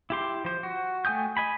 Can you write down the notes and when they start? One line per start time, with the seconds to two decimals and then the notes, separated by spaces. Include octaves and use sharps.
0.10 E4 G4 C6
0.45 F3 C5
0.63 F#4
1.05 A3 G5 G#5 D#6 G6
1.37 D#5 G#5 B5